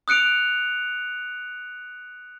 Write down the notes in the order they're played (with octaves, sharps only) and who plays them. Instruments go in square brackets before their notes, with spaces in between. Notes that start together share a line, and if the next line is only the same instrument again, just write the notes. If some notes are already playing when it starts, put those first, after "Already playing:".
[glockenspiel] D#6 F#6 C#7 D7 F7